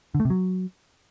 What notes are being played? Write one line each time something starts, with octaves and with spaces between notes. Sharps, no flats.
D3
A3
C3
F#3